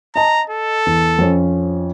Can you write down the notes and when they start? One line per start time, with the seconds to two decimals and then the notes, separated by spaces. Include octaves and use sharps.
0.16 D#5 A5 A#5
0.50 A4
0.86 E2
1.18 F2 F3 C#4